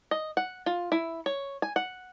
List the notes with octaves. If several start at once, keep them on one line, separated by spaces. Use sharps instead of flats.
D#5
F#5
F4
E4
C#5
G#5
F#5